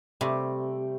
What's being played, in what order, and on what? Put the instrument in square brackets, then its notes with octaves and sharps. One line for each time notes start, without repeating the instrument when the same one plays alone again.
[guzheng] C3 [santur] G3 A3